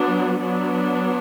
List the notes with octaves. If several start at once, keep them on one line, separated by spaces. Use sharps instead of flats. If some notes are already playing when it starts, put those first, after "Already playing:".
Already playing: F#3 B3 D4
F#3 B3 D4